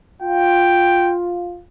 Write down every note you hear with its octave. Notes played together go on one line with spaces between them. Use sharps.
F4 G5